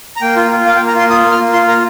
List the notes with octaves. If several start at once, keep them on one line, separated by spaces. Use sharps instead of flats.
A#5
A#3 G5
F4
F4
A#3 F5
G5
A#3
A#5
F4 C6
F4 D#6
A#3
F6
A#3
F4 C6
A#3 A#5